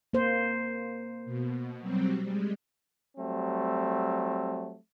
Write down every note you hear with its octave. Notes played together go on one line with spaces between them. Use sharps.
A#3 C5
B2
F#3 G3 C4
G3 G#3
F#3 G3 A3 C4